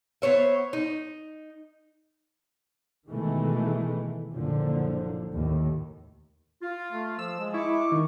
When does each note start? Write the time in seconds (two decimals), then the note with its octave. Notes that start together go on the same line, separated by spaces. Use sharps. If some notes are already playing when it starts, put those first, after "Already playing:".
0.22 B3 C5 C#5 E5
0.73 D#4
3.08 B2 D#3 E3 G#3 A3
4.32 F#1 A#2 D3 F3
5.33 D#2 A2
6.62 F4
6.92 A3
7.19 F3 E6
7.39 G#3
7.54 E4 C#6 D6
7.92 D#3